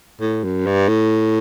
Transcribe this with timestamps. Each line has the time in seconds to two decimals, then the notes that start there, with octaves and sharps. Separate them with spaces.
0.21 A2
0.44 F#2
0.66 G2
0.88 A2